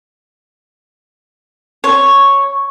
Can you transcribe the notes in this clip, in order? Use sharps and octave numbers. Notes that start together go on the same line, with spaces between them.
C#5